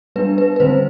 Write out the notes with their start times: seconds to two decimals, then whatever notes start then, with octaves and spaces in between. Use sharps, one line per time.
0.16 G3 B3 D4 B4
0.38 B4
0.56 B4
0.60 D3 G3 C4 C5